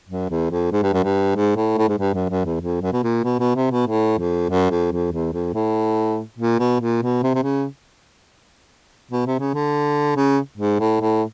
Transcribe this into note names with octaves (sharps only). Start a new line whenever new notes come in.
F#2
E2
F2
G#2
G2
F#2
G2
G#2
A2
A2
G#2
G2
F#2
F#2
E2
F2
F#2
B2
A#2
B2
B2
C3
B2
A2
F2
F#2
F2
F2
E2
F2
A2
A#2
B2
A#2
B2
C3
C3
C#3
B2
C3
C#3
D3
C#3
G#2
A2
A2